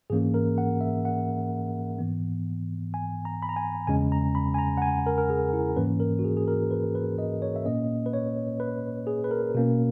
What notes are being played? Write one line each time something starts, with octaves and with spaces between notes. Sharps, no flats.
G#2 E3 A#3 C#4 G#4
A#4
F#5
E5
F#5
G#2 E3 B3
G#5
A#5
B5
A#5
G#5
E2 C#3 G#3 C#4 G#5
A#5
B5
G#5
A#5
F#5
G#5
A#4
A#4
G#4
E4
G#2 E3 A#3 C#4 B4
A#4
F#4
G#4
G#4
A#4
B4
B4
D#5
C#5
E5
A#2 A#3 C#4 D#5
B4
C#5
B4
G#4
B4
A#4
B2 A#3 C#4